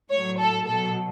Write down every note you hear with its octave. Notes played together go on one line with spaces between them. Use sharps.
A2 F#3 C#5
A4
B2 F#3 A4